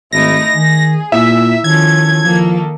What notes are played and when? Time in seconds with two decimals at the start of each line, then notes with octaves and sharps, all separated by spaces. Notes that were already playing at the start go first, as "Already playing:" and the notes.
0.13 G#1 A3 D#4 E4 A#6
0.55 D#3 G#4
1.12 A#2 E4 E5 E6
1.64 D#3 F3 C#4 A4 G#6
2.24 D#3 F3 A#3 A4